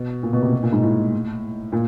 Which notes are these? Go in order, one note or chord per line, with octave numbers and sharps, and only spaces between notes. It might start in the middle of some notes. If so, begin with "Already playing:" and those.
Already playing: B2
A#2
B2
C3
B2
A#2
G#2
A2
A#2